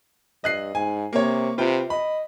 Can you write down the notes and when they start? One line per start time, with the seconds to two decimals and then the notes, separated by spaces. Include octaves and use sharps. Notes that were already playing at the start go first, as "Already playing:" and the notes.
0.44 G2 D#5 F#6 C7
0.75 G#2 G#5
1.13 C3 A#3 C#5
1.58 C3 F4 B4 G5
1.90 D#5 B5